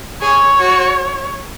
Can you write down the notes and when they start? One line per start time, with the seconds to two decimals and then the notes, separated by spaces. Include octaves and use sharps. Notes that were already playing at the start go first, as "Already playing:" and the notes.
0.22 G#4 C#5
0.60 F#4